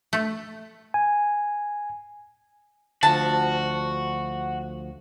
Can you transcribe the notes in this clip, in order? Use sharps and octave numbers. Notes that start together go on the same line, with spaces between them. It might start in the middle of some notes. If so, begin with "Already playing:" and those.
A3
G#5
D2 F3 F#4 A5